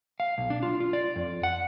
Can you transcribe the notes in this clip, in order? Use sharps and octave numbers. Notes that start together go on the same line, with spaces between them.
F5
B1
D4
F4
F4
D5
F2
F#5